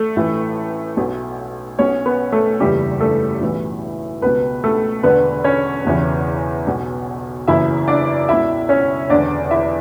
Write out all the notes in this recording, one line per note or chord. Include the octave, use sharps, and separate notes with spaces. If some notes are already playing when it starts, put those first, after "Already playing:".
Already playing: A3 A4
A1 A2 E3
B1 B2
B1 B2 C#4 C#5
B3 B4
A3 A4
F#1 E2 C#3 E3 G3 G4
A3 A4
B1 A2 E3
C#2 B2 B3 B4
A3 A4
E1 E2 D3 B3 B4
C#4 C#5
E1 E2 C#3 E3
B1 B2
F#1 F#2 C#3 E3 E4 E5
D4 D5
C#2 B2 E4 E5
C#4 C#5
E1 E2 D3 D4 D5
E4 E5